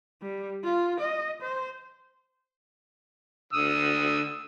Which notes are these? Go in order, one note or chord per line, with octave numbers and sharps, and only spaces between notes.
G3
F4
D#5
C5
D3 D#6 E6